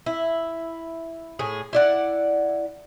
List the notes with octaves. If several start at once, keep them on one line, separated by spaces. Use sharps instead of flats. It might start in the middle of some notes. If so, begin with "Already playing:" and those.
E4
A2 G#4
E4 D5 F#5